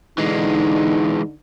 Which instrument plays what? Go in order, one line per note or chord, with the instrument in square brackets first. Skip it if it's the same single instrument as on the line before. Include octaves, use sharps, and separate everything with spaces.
[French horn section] D3 D#4 [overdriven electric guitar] E3 G#3